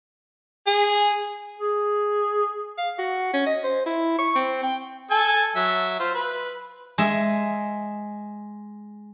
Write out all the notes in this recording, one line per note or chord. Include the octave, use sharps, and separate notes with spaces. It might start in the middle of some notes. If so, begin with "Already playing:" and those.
G#4
G#4
F5
F#4
C#4
D#5
C5
E4
C#6
C4
G5
A4 G#5 A5
F#3 E5
F4 C5
B4
G#3 E5